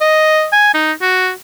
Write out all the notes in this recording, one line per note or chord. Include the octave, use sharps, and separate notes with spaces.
D#5
G#5
D#4
F#4